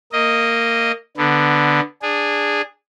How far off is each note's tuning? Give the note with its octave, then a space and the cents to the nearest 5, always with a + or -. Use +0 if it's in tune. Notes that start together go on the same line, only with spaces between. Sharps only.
A#3 -15 D#5 +0
D3 +5 B3 +0
D4 +0 G#4 -10